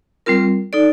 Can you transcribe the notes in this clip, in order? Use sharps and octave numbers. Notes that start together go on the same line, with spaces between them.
G3 C4 F4 A#4
D#4 A4 D5